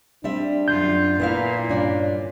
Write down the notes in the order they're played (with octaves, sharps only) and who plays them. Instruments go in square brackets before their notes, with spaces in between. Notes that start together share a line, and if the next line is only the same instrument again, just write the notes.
[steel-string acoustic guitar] G3 C4 E5 [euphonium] D4
[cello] F#2 F4 [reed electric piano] G6
[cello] A#2 [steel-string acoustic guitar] B3 E4 F5
[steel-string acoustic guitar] G2 D4 F4 [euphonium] C#4